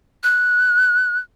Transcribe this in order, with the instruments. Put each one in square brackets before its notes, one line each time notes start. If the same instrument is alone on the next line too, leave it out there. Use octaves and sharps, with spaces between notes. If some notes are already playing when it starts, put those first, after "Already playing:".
[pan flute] F#6